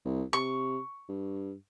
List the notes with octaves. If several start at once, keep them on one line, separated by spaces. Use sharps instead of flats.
C2
C3 C#6
G2